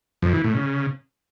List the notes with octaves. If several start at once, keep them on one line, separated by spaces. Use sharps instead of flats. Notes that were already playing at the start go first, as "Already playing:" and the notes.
F2
E3
A2
C#3